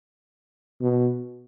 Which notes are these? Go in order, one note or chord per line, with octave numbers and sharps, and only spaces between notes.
B2